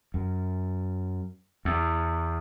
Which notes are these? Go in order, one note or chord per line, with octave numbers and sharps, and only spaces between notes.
F#2
E2